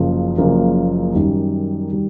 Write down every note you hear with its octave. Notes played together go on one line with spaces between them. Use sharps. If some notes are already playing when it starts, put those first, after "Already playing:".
Already playing: F#1 F#2 C#3 F3 A#3
F#1 F#2 C#3 F3 A#3
F#2 D#3 G3
D#3 G3